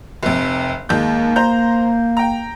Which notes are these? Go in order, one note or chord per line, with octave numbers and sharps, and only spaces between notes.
F1 C3
D#2 G#3 A#3 G6
C5 A#5 G6
G5 A#5